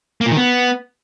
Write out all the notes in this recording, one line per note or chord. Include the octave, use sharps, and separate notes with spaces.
A#3
A#2
D#3
B3